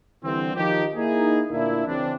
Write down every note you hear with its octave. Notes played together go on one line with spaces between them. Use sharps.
D3 E3 G3 C4
D#3 F3 D#4 G4
A#3 D#4 E4 G#4
D2 A#2 A#3 D4 E4
C#3 E3 C4 D4